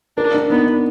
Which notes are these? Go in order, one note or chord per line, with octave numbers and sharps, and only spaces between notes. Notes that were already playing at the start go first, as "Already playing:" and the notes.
D4 A#4
D4
B3 D#4
D4